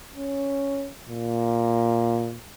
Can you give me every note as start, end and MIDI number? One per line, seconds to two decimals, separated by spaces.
0.16 0.90 61
1.09 2.36 46